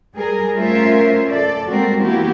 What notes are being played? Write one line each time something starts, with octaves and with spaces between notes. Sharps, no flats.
G3 G#4 A#4
A3 C#4 F4 A#4 C5 E5
A4 D5
G3 G#3 A#3 C4 F#4 A#4
E3 A#3 B3 E4 F#4 G4